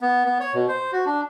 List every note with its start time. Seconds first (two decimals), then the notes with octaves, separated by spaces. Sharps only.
0.01 B3
0.25 B3
0.40 C#5
0.55 B2
0.68 C5
0.92 F#4
1.06 D4